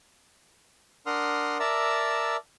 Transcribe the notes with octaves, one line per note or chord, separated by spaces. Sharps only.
D4 A#4 F#5 C6 D#6 F6
A#4 D5 E5 A5 A#5 E6